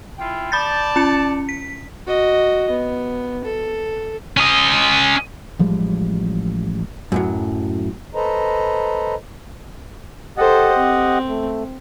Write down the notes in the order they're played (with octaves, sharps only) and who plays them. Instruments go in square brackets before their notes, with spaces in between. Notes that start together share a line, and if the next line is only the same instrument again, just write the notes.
[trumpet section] E4 F4 G5
[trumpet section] D5 A5 [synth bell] B5 G6 A6
[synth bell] C#4 C#7
B6
[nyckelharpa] F#4 D#5
B3
A4
[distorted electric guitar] C#4 D#5
[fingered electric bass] A1 F3 G3 G#3
[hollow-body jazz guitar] F#2 A2 F#3
[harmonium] A4 B4 C5 D#5 A#5
[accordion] G4 D#5 F#5 [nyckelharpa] A4 C5
[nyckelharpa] C4
[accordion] A3